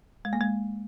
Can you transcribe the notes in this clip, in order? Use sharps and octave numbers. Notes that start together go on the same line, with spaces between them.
G#3
A#3
G#3